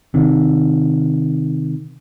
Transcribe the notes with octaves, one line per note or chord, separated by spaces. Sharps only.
C3 D#3